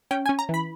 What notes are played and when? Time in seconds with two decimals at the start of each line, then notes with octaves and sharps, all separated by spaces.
0.11 C#4 G5
0.26 G#5
0.29 C#4
0.39 A#5
0.49 E3 B5